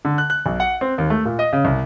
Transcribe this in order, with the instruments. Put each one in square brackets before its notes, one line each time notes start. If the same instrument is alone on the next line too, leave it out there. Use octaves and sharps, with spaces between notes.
[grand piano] D3
F#6
F#6
B1
F#5
C4
D#2
A3
A#2
D#5
C#3
C2